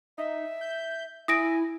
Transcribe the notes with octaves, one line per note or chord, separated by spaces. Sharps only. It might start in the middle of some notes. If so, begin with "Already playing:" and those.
D#4 E5
G6
E4 G#5 D#6 A#6 D7